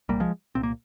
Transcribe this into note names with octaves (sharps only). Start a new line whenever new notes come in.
C2 A#2 G3 A#3
F3 G#3
C2 A#2 C4
A#3